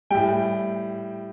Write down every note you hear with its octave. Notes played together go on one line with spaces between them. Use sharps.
A2 G3 G5